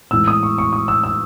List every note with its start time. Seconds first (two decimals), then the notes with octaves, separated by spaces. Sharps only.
0.11 A2 E3 G#3 E6
0.28 D#6
0.43 C#6
0.58 C#6
0.73 D#6
0.88 E6
1.04 E6